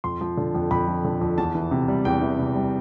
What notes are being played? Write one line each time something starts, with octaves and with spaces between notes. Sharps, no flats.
F2 C6
F3
D3
F2
F2 B5
F3
D3
F2
E2 A5
E3
C3
G3
E2 G5
E3
C3
G3